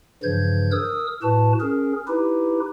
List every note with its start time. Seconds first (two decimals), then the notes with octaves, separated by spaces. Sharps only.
0.23 G2 C#3 E3 F3 G6 G#6
0.72 A#4 D#6 E6
1.22 A2 F#4 B4 A5
1.60 C#4 G#4 A#4
2.07 D#4 E4 G4 B4